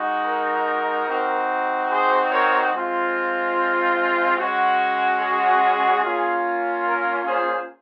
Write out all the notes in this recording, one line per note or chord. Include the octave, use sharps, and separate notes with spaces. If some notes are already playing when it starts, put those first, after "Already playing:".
Already playing: G#3 D#4 F#4
A#4
C4 D#4 F#4
G#4 C5
A#4 C#5
G#3 C4 F4
G#3 C#4 F#4
G#4
A#3 C#4 F4
A#4
G#4 C5